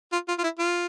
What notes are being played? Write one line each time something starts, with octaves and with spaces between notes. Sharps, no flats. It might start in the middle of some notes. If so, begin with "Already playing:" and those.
F4
F4
F4
E4
F4